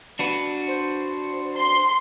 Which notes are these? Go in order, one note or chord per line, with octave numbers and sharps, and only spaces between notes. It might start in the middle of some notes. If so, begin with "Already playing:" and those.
D4 F#4 B4
C5
C6